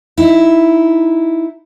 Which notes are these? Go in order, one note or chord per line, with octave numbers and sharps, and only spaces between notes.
D#4 E4